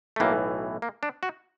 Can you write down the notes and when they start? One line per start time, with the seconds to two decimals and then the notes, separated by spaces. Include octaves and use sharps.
0.16 A3
0.20 B1 A2 E3 A#3
0.82 A#3
1.03 D4
1.23 F#4